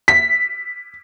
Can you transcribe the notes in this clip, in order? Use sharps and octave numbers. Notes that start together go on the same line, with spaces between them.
B6